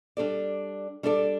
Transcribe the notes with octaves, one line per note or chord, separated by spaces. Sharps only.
G3 D4 A4 D5
G3 D4 A4 D5